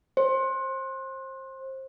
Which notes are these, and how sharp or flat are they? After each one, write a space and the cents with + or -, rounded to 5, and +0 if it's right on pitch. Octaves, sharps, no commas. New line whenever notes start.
C5 +25